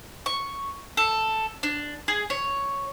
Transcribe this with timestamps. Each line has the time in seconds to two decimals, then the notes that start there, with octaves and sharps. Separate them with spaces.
0.26 C#6
0.97 A4
1.63 D4
2.08 G#4
2.30 C#5